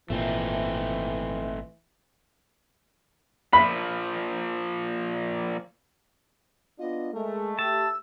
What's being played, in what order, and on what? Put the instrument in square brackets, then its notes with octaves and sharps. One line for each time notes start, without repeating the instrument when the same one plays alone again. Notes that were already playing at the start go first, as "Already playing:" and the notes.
[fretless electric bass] G#1 A#2 [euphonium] E3 [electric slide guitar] A3 C4 D#4
[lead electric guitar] A#2 F3 [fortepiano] B5
[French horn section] B3 D4 F4 [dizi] D#5
[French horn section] G#3 [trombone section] A3 [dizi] A#4
[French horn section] G4 [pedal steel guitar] A5 [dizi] E6